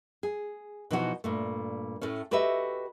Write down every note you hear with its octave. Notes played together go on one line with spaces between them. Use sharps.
G#4
B2 E3 F3 D#4 E4 F#4
G2 A#2 A3
A2 A3 C#4
F#4 G4 A4 B4 D#5 E5